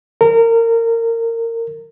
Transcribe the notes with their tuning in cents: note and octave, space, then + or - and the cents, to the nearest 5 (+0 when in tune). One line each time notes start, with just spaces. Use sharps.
A#4 -25